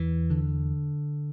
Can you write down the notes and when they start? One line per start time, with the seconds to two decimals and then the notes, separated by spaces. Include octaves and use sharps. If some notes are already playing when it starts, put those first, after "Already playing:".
Already playing: E2 E3
0.30 D3